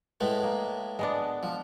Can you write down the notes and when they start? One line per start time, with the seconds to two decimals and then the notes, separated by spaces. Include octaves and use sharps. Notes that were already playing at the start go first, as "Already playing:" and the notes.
0.21 A2 G#3 B3
0.43 A#3
0.99 G#3 B3 D4
1.43 F3